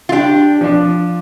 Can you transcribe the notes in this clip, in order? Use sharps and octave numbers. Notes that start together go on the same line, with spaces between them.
F4
D4 G4
F3 D4 F4